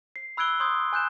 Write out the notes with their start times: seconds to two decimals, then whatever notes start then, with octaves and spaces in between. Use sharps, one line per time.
0.16 C7
0.37 B5 E6 F#6 G#6 D7 G7
0.60 C6 D#6 G6 G#6
0.93 G#5 F#6 G6 E7